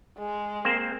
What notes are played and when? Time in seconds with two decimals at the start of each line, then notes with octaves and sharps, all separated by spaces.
0.18 G#3
0.65 A#3 C4 C5